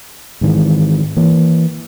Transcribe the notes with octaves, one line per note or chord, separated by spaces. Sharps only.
G#2 D#3 E3
E3 A#3